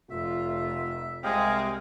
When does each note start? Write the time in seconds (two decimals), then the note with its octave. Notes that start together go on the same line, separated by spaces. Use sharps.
0.10 F1 F4 E5
1.24 C2 C3 G#3 D#5 F5 G5